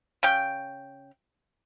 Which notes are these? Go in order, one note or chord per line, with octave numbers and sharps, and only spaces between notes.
C#3 G5